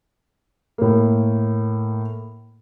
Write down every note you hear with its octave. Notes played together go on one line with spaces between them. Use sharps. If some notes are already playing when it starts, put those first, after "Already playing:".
A2 A#3